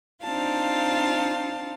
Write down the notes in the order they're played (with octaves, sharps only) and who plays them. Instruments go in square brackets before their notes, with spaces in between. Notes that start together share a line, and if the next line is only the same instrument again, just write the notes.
[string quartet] C4 D4 D#4 F4 F5 A5